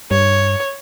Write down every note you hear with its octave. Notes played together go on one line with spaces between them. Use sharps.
G2 C#5